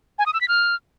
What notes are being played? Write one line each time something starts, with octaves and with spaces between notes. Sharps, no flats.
G#5
D#6
E6
B6
F6